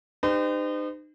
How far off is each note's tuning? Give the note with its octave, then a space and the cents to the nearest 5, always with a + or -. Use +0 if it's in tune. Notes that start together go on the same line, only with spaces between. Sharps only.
D#4 -35 G4 +30 C5 -40